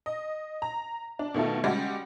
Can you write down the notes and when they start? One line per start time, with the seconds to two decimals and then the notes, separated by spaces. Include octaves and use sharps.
0.06 D#5
0.62 A#5
1.19 D4
1.34 B2 D#3 A3 F4 A4
1.64 G3 G#3 C#4 F#4 G4